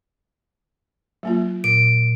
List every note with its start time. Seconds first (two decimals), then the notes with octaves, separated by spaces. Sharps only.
1.23 F#3 A#3 F4
1.64 A#2 D7